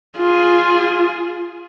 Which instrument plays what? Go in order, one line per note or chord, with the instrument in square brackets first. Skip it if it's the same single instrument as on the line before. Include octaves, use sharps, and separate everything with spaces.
[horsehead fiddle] F4 G#4